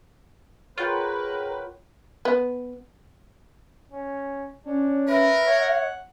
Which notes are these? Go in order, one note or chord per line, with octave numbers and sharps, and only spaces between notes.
F4 G#4 A#4 B4 C#5 F#5 G5
B3
C#4
C#4 D4
A#4 B4 E5
C#5 F#5